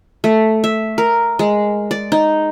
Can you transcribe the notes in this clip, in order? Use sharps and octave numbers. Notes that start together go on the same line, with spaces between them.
A3
E5
A#4
G#3
D5
D#4